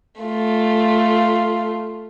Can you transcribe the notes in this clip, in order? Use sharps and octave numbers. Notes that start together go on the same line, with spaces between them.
A3 F4